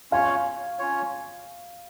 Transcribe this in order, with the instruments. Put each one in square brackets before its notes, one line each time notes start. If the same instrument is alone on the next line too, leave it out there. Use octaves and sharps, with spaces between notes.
[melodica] C#4 F4 C#5 [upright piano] F5
[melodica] C#4 F4 C#5